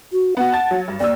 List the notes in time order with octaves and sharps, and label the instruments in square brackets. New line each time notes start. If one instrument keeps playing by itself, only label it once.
[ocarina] F#4
[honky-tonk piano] B3 F#4 [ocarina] F#5
[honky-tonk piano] A5 A6
F#3
G2
[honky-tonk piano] D#2 E6 [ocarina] D5